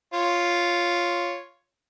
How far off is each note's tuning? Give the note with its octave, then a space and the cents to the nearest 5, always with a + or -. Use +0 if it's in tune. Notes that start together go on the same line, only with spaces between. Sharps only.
F4 +0 C#5 +0